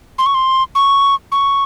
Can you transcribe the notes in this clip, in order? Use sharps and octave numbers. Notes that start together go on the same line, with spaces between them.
C6
C#6
C6
C#6
C#6